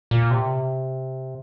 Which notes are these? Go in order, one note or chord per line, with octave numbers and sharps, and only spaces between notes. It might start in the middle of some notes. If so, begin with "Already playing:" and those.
A#2
C3